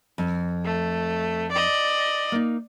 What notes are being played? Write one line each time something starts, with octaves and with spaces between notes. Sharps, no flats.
F2
A3
D5 D#5
A#3 D#4